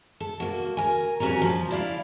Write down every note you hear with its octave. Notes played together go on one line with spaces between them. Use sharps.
A4
A#3 F#4
A#4 G#5
F2 G3 C#4 F#4 G#5 A#5
F3
E4 D5 F5